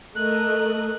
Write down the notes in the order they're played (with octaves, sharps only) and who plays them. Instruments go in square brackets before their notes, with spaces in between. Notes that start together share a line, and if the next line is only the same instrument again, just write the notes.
[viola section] A3 A#4 D#5 [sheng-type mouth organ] F#6